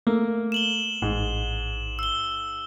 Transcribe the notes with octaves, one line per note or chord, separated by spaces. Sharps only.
A3 A#3
E7 F#7 G7
A1 G#2
E6 G7